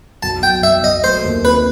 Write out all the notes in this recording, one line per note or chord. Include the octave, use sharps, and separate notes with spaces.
B1 A5
B1 G5
B1 E5
B1 D#5
A3 C5
D#2
C4 B4